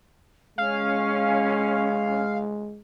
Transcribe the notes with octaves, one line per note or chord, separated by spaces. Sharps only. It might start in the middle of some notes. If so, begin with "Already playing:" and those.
G#3 C#4 F5